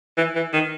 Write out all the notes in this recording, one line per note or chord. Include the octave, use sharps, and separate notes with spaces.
E3
E3
D#3